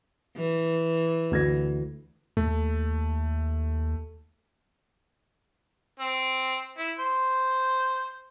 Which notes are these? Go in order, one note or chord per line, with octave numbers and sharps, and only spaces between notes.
E3
D2 G#6 A#6
D#2 A3
C4
E4
C5